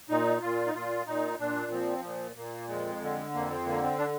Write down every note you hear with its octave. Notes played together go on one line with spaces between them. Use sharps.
A#2 D#4
A#2 F4
D#4
A#2 F4
A#2 D#4
A#2 D4
F3 C4
A#2
A#2 A#3
F2 G#3
D3
F2 A#3
C4
D3 A#3
C4
D4